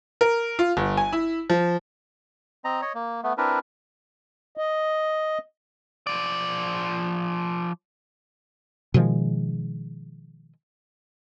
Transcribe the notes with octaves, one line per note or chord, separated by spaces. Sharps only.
A#4
F4
G1
G#5
E4
F3
C4 D#5 A#5
C#5 D#5
A#3
A3 B3
C4 D4 E4 A#4 B4
D#5
F3 D5
B2 D#3 F3 G#3